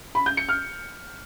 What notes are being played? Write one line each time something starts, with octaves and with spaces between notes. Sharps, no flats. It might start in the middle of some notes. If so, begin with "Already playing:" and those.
B5
G6
C#7
F6